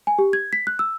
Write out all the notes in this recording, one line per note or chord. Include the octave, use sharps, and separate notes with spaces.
G#5
G4
G#6
B6
F#6
E6